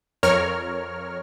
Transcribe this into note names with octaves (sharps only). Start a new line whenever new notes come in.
F2 A#4 C#5 F6